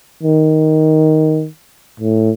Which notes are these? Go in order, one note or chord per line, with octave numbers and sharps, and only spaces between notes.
D#3
A2